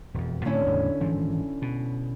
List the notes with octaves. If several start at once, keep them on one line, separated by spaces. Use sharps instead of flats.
E1 F2
A2 D3 A3 C4 C#4 E4
E2 A2 C#3
G#1 E3 F3
B2